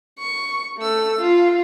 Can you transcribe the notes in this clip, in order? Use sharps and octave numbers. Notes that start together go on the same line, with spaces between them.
C#6
A3 E6
F4